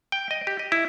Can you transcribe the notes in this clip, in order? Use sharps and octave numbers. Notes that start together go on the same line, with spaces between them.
G5
D#5
G4
D#5
E4